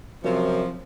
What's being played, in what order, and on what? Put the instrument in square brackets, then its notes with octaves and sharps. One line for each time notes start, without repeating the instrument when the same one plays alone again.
[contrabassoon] F#2 [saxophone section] C3 F3